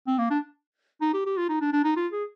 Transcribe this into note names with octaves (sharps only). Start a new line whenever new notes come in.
C4
A#3
D4
D#4
G4
G4
F4
D#4
D4
D4
D#4
F4
G#4